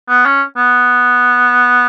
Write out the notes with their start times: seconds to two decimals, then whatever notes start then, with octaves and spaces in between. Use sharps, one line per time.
0.09 B3
0.26 C#4
0.57 B3